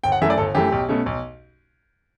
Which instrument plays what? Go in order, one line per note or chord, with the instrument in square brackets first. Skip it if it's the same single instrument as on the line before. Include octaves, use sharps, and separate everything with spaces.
[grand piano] G1 G5
F#5
F#2 E3 A3 E5
D5
G1 A4
F#2 E3 A3 G4
B1
B2 A3 C#4
B1